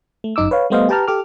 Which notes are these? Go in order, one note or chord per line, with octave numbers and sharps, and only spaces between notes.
A3
G1 F#2 D#4 D6 E6
B4 C#5 F5
G3 A3 B3 C5 D#5 F5
G4 B4 G5 A5 A#5 F6
G4 A4 D6 F6